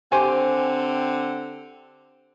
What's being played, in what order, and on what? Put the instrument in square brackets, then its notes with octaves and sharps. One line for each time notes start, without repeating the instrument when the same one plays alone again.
[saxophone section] D3 C4 [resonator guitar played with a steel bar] G4 C5 G#5